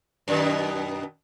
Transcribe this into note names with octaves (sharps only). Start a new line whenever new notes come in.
F#2 B2 D#3